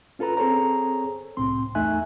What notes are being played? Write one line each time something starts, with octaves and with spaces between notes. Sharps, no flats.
C#4 F4 A4 B4 A#5
C4 G#4 A4 C5 C#5 A#5
C2 A2 C4 C6
E2 A3 D#4 E5 G#5 F#6